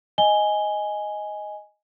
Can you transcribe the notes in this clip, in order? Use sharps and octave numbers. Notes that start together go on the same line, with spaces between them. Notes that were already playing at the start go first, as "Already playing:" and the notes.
D#5 G#5 G7